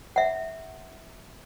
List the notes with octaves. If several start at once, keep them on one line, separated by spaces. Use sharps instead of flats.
E5 F#5